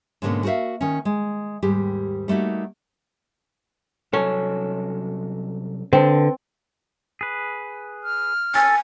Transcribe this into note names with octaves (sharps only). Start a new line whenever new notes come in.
G#2 B2 D3 G#3 A#3 C#4
F#4 A#4 C5 E5 F5
D#3 C#4
G#3
D#2 G#2 G3 G4
G3 A3 A#3 D#4 F#4
C2 F#3 C#4 A4
D3 C4 B4 A5
G#4 B4
F6
A4 G#5